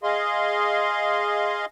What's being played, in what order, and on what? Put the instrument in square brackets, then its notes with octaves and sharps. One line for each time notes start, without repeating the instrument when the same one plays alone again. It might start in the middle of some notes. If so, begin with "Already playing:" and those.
[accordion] G#4 D#5 F5 C6